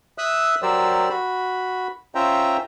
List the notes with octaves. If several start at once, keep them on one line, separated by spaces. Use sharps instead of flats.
E5 D#6 E6 F#6
F#3 G4 A#4 C5 D5 E6
F#4 B5
C#4 F4 C5 E5 G5 A#5